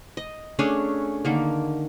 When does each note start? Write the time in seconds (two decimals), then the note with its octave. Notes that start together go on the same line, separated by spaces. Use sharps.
0.17 D#5
0.59 A3 C#4 D4 G#4
1.25 D3 D#3 A#3